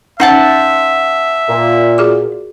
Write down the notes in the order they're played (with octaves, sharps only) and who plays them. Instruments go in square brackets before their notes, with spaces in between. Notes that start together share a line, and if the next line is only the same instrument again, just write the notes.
[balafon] C#4 D#4 [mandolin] C5 F#5 A5 [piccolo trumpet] E5
[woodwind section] A#2
[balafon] F#4 G#4 D6